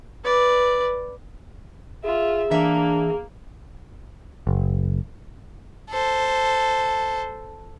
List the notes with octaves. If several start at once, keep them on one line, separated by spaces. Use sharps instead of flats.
B4 D5
F4 G#4 E5
E3 A#3 D4 E5
F#1
A4 C5